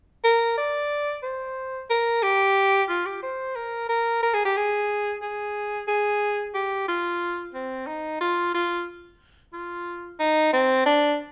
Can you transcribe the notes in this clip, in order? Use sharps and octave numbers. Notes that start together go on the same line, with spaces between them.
A#4
D5
C5
A#4
G4
F4
G4
C5
A#4
A#4
A#4
G#4
G4
G#4
G#4
G#4
G4
F4
C4
D#4
F4
F4
F4
D#4
C4
D4